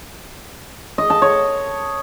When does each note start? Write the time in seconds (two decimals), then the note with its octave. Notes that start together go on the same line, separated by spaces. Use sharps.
0.98 D#5
1.10 A5
1.22 C#5